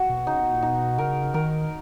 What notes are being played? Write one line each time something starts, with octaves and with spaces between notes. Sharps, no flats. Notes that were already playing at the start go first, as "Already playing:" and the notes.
Already playing: F#4
B2
C#3 D#4
B2
A#2
B2 D#4
C#3 A#4
D#3 A#4